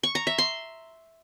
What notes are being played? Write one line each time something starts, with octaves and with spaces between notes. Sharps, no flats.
C#6
A#5
E5
C6